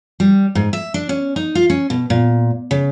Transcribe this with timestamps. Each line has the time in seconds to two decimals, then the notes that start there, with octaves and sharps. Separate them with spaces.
0.20 G3
0.55 G#2
0.73 E5
0.94 D4
1.09 C#4
1.36 D#4
1.55 F4
1.70 C#4
1.90 B2
2.10 A#2
2.71 C#3